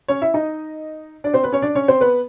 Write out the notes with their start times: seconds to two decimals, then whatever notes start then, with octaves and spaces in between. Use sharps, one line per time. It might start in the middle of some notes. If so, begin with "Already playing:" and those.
0.08 C#4 C#5
0.22 E4 E5
0.34 D#4 D#5
1.24 D4 D5
1.34 C4 C5
1.43 B3 B4
1.52 C#4 C#5
1.62 D4 D5
1.75 C#4 C#5
1.88 C4 C5
2.01 B3 B4